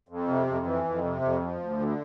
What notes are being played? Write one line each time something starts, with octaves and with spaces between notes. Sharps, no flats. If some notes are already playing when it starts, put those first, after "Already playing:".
F2
C3
F2
E3
F2
C3
F2
F3
D2
D3